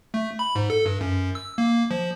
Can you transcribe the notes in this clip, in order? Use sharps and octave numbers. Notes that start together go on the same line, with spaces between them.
A3
B5
G#2
A4
G2
F#2
E6
A#3
F3